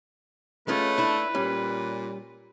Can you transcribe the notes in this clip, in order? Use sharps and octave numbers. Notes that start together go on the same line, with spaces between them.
G#3 A3 C#4 F4 B4
D4 E4
A#2 G3 C#4